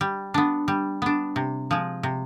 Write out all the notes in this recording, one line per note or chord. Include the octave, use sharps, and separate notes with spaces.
G3
B3 D4
G3
B3 D4
C3
F3 G#3
C3